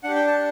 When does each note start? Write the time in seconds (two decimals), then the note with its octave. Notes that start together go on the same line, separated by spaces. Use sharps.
0.03 D4 G4 F#5
0.15 G5
0.27 A5